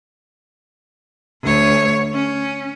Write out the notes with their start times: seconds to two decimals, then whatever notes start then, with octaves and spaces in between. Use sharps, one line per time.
1.43 D2 C#5
2.14 C#4